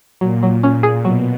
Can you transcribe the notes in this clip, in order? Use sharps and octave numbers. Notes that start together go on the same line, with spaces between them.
A#2 F#3
F#3
A#2 C#4
G#4
B2 F#3